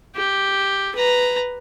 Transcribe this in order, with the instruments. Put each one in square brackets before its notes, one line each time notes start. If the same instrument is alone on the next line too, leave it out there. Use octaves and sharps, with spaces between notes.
[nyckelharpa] G4
B4 A#5